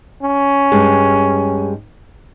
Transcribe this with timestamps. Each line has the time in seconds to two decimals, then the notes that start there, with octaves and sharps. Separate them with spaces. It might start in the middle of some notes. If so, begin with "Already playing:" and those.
0.23 C#4
0.72 G2 G#3